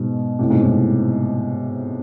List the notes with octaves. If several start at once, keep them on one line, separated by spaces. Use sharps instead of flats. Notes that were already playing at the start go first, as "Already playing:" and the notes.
Already playing: G#2 B2
A2 C3
G#2 B2
A2 C3